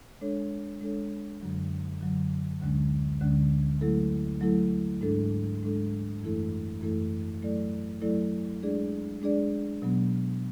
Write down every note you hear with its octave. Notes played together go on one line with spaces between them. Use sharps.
G#3 D4 A4 C#5
G#3 D4 A4 C#5
F#2 D3 F#3
F#2 D3 F#3
D2 D3 G#3 C#4
D2 D3 G#3 C#4
F#3 A3 E4 A4
F#3 A3 E4 A4
G#2 G#3 D4 A4
G#2 G#3 D4 A4
F#2 E3 A3 E4 A4
F#2 E3 A3 E4 A4
F#3 A3 E4 A4 D5
F#3 A3 E4 A4 D5
G#3 D4 G#4 D5
G#3 D4 G#4 D5
B2 F#3 B3